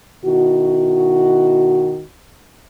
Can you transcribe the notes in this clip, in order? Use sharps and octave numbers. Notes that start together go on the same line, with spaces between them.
B2 D#3 E4 F#4